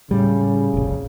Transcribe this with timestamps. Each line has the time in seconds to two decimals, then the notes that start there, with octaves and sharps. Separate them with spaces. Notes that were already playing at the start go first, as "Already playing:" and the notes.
0.11 A2 C#3 G3
0.74 F1 A#1